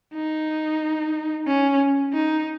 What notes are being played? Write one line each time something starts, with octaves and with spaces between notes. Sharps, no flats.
D#4
C#4
D#4